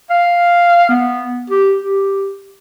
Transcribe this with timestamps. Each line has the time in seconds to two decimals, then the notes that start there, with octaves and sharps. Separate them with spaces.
0.10 F5
0.89 B3
1.50 G4
1.82 G4